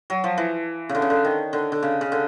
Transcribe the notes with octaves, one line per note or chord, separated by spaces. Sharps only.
F#3
F3
E3
C#3
D3
C#3
D3
D#3
D3
D3
C#3
C#3
D3